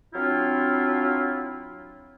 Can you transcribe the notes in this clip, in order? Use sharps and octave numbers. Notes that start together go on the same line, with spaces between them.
F#3 C4 D4 E4 F4